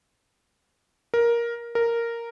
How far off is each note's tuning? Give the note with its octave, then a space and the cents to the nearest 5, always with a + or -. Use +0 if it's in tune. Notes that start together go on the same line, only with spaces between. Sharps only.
A#4 +10
A#4 -5